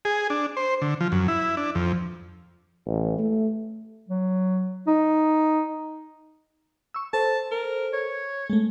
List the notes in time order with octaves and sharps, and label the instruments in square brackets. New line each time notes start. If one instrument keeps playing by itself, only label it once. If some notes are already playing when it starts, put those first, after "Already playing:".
[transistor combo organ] G#4
D4
C5
D3
F3
F#2
E4
D4
F2
[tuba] A1
A3
[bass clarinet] F#3
D#4
[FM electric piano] C#6 E6
[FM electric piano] A4 C5 [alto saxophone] A5
[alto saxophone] A#4
C#5
[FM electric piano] G#3 A3